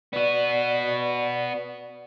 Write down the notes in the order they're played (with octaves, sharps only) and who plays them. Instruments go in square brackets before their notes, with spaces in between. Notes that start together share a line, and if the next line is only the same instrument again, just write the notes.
[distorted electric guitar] B3 F#4 [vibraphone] D5